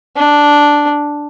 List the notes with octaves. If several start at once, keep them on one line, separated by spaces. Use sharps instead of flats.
D4